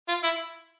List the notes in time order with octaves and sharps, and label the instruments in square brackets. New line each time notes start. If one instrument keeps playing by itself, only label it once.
[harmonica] F4
E4